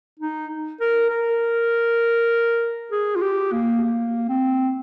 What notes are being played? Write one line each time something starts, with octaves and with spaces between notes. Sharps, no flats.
D#4
A#4
A#4
G#4
F4
G4
A#3
A#3
C4